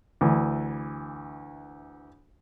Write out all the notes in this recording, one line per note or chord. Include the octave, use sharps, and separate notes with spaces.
D2 E3